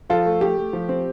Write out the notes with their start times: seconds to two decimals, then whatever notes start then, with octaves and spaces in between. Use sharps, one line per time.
0.09 F3 F4 A4
0.26 A3
0.41 A3 G4
0.57 A3
0.73 F3
0.89 C4